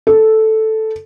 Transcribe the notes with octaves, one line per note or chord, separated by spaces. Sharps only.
A4